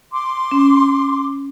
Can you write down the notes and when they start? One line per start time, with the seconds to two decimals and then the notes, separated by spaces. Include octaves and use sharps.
0.12 C6 D6
0.51 C#4